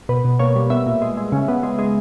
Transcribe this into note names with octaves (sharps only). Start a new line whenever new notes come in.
B2 B4
B2
A#3 C#5
G3
B3 E5
A#2
G#3
G#3
C#3
B3
G#3
G#3